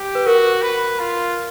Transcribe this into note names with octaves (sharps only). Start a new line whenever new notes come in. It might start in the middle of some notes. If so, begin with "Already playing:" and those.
Already playing: G4
B4
F#4 A#4
B4
F4